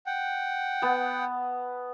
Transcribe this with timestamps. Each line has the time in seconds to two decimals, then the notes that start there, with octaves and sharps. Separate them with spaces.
0.06 F#5 G5
0.82 B3 A5